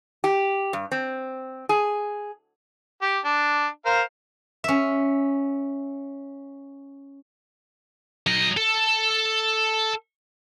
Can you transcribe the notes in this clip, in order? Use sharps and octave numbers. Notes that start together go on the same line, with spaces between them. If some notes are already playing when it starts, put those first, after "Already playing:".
G4
G2
C4
G#4
G4
D4
A#4 C5 F5
C#4 E5
F#3 D#5
A4